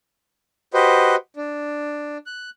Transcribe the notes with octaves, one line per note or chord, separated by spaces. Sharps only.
F#4 G4 B4 C5 D#5
D4
F#6